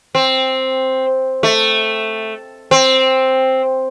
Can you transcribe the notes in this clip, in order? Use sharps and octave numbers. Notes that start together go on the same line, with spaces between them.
C4
A3
C4